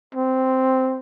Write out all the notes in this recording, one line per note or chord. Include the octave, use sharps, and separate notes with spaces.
C4